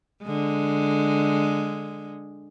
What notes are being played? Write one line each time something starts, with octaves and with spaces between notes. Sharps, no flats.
D3 G#3